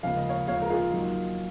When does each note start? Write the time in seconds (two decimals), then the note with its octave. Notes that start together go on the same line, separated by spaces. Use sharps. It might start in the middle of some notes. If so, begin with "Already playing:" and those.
0.03 D#2 C#3 F3 G#3 F5
0.17 D#5
0.29 C#5 F5
0.47 D#2 C#3 F3 G#3 C#5 F5
0.62 A#4
0.70 F4 G#4
0.93 D#2 D#3 F#3